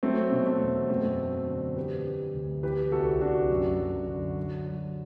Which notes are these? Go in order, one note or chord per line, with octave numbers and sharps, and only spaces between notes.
F#3 A3 C4
B2
A3 C4
E2
F#2 A3 C4
F#3
D3
E3 G4 B4
E3
D2
E3 G4 B4
C2 F#4 A4
C2 D4 F#4
F#2
F#2
D3
F#3
F#3